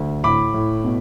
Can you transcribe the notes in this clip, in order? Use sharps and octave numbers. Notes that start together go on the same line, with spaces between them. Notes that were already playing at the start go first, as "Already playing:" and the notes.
Already playing: D2
A2 B5 D6
A2
B2